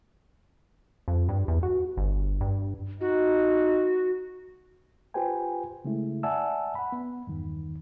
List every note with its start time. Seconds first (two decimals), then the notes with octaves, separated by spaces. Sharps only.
1.08 F2
1.29 G2
1.48 E2
1.63 F#4
1.97 G1
2.41 G2
3.01 D#4 F#4
5.14 F4 G4 B4 C5 G5 G#5
5.85 C#3 G#3 A3 E4
6.23 D5 E5 F#5 G#5 A5 E6
6.75 F#5 B5
6.92 B3
7.27 E2 G2 D#3